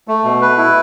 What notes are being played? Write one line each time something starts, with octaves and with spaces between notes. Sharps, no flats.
A3
B2
B4
E4